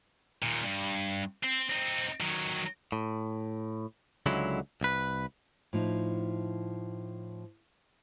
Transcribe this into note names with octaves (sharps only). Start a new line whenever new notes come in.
D#2 A#2
G2
C4
C4 D#4
D#3 F#3
A2
C#2 D3 F#3 G#3 E4
C2 B4
A2 F3 D#4